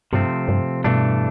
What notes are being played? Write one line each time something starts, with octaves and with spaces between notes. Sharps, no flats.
G2 C3 F3 A3 C4
G2
G2 B2 E3 A3 D4